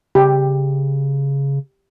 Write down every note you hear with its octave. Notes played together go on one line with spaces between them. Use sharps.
C#3 G4